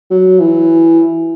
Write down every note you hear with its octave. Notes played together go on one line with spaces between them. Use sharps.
F#3
E3